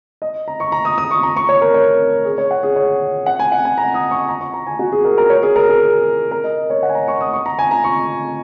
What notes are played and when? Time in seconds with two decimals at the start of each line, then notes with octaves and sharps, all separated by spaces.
0.22 D#5
0.48 A#5
0.60 C#6
0.72 A#5
0.85 D#6
0.98 D#6
1.11 C#6
1.23 A#5
1.37 C#6
1.49 C#5
1.62 A#4
1.74 C#5
2.25 G#4
2.38 C#5
2.51 F#5
2.63 G#4
2.76 C#5
3.26 F#5
3.39 G#5
3.52 F#5
3.65 G#5
3.78 A#5
3.94 D#6
4.11 C#6
4.29 A#5
4.41 C#6
4.54 A#5
4.67 G#5
4.79 F#4
4.92 G#4
5.05 A#4
5.18 A#4
5.30 C#5
5.43 G#4
5.56 A#4
5.68 G#4
6.31 A#4
6.44 D#5
6.70 C#5
6.83 F#5
6.89 G#5
6.95 A#5
7.08 C#6
7.21 D#6
7.33 C#6
7.46 A#5
7.59 G#5
7.71 A#5
7.84 C#6